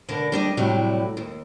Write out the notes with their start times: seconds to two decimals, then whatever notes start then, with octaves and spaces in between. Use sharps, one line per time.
0.08 B2 D3 D4 A#4
0.32 G3 D4 D#5
0.57 A2 C3 F#3 G3 A3 E4
1.17 D#2